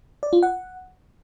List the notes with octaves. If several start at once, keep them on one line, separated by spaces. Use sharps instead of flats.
D5
F4
F#5